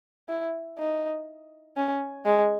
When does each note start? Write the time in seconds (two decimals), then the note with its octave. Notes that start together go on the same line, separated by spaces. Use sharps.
0.29 E4
0.78 D#4
1.77 C#4
2.26 G#3